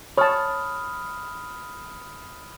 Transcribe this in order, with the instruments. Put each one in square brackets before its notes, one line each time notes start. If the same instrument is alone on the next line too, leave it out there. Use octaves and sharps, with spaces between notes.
[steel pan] C#5 A5 [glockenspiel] B5 D#6 F6